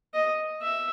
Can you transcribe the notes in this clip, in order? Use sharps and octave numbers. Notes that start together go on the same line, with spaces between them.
D#5
E5